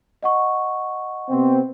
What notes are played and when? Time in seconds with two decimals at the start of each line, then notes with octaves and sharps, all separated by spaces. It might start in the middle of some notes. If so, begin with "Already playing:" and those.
0.23 D#5 F#5 C#6
1.29 C3 B3 C4